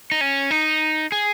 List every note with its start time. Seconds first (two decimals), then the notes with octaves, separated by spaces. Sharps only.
0.12 D#4
0.21 C#4
0.51 D#4
1.12 G#4